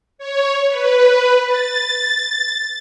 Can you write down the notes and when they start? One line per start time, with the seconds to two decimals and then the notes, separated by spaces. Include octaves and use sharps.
0.18 C#5
0.69 B4
1.47 A6